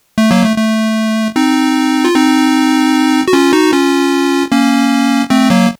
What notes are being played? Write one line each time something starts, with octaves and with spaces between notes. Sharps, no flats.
A3
F#3 A#3
A3
A3
C4 D#4
F4
C4 D#4
F#4
C#4 F4
D#4 F#4
C#4 F4
A#3 C#4
A3 C4
F#3 A#3